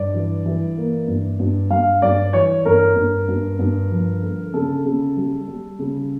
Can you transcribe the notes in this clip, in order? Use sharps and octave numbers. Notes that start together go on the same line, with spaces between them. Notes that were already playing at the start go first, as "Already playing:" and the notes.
Already playing: G2 D5
E3
E3
A#3
G2
G2
G2 F5
G2 D5
E3 C#5
G2 A#4
G2
G2
G2
F3
D3
C#3 A4
C#3
G3
G3
C#3